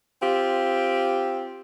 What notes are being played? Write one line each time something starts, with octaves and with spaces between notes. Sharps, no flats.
C4 F4 G4